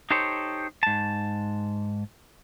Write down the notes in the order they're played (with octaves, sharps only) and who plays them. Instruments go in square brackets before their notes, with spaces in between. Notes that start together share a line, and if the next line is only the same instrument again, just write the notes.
[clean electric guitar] D#4 G4 A4 C5 C#5
G#2 A5